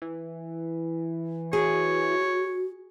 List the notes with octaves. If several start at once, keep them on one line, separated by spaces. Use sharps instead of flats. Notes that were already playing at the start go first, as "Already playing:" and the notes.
E3
F#4 G#4 C#5